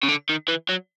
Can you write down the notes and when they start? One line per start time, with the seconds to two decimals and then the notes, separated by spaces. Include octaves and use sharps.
0.03 C#3
0.09 D3
0.29 D#3
0.48 E3
0.69 F#3